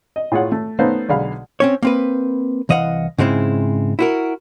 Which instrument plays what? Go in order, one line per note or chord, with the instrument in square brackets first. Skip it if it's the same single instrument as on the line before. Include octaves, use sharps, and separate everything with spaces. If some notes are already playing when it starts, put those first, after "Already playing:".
[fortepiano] D#5
A2 F4 G#4 C#5 F#5
A3
A3 B3 C#4 D#4 C5 F5
B1 D3 G#3 F5 B5
[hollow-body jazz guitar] C4 C#4 C#5
A#3 C4 B4
C2 E3 D#5 F5 F#5
G#2 C#3 G#3 C4 E4
E4 F#4 A#4